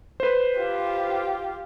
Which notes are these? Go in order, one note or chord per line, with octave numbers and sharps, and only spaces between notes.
B4 C5
F4 G4